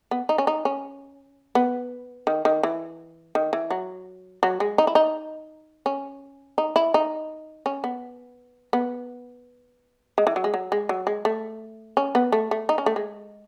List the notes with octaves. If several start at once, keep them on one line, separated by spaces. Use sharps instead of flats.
B3
D#4
C#4
D#4
C#4
B3
D#3
D#3
E3
D#3
E3
F#3
F#3
G#3
D#4
E4
D#4
C#4
D#4
E4
D#4
C#4
B3
B3
G#3
E3
F#3
G#3
F#3
G#3
F#3
G#3
A3
C#4
B3
A3
A3
D#4
C#4
A3
G#3